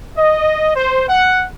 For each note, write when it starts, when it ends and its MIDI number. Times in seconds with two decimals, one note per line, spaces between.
0.17 0.71 75
0.75 1.06 72
1.08 1.45 78